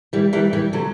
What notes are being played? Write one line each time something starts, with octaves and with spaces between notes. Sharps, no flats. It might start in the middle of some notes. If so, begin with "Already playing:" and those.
E3 G3
E3 G3
E3 G3
D3 F#3